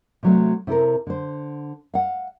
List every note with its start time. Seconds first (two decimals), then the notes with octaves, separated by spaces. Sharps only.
0.23 C3 F#3 A3
0.67 C3 E4 A4 A#4
1.07 D3 C5
1.94 F5 F#5